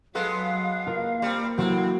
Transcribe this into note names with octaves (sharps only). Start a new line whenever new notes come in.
F#3 G#3 B3 A4 F5
A#3 F4 A#4
G3 C4
A2 F#3 C4 E4